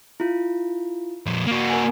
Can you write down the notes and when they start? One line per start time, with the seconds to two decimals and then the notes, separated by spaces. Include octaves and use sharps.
0.20 E4 F4
1.26 F2 A#2
1.47 A#3 F#4
1.69 A#4 G#5